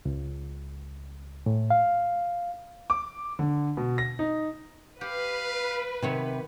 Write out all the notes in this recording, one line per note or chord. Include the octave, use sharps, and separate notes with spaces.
C#2
A2
F5
D6
D3
B2
A#6
D#4
G4 B4 F5
C3 D#3 F#3 C#5